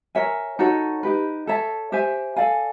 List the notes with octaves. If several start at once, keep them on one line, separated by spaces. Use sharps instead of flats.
A#4 C#5 E5 G#5
D#4 F#4 A4 C#5
D#4 G4 B4
A4 C#5 E5 A5
G4 C5 E5 G#5
A4 D5 F5 G#5